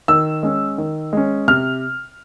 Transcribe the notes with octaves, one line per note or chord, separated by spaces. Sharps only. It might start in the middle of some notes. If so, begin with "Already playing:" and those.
D#3 E6
G#3 C#4
D#3
G#3 C#4
C3 F6